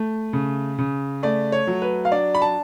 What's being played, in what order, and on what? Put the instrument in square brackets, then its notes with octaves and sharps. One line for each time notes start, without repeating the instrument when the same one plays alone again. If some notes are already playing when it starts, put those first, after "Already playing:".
Already playing: [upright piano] A3
C#3
C#3
A3 D5
C#5
F#3
B4
F5
D4 D5
B5
A5